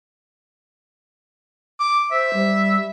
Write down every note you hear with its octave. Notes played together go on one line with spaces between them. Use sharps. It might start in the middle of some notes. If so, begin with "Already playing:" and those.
D6
C5 E5
G3